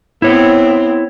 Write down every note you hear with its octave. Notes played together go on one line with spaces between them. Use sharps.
B3 C4 E4 C#5